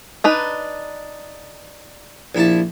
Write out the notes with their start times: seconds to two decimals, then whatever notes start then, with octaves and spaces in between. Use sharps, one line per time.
0.24 D4 D#4 B4
2.35 A#1 E4 A5